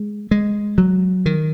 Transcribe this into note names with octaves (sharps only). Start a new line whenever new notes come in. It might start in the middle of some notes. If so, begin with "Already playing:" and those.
Already playing: G#3
G#3
F#3
D#3